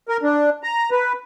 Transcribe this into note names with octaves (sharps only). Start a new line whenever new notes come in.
A#4
D4
A#5
B4